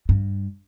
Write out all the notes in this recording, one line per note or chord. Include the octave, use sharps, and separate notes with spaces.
G2